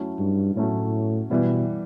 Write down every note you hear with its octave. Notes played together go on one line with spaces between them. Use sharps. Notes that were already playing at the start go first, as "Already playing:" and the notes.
Already playing: F#3 A3 C#4 E4
G2
A2 F#3 A3 C#4 E4
B2 E3 G3 B3 E4